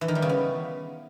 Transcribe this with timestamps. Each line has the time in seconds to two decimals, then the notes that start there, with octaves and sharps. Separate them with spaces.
0.01 E3
0.08 D#3
0.15 G3
0.22 C#3
0.29 B3